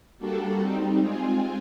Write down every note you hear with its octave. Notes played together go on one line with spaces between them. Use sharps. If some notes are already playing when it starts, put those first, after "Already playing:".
G3 A#3 D4 F#4 A4
G3 C4 D#4
G#3 C4 F4 G#4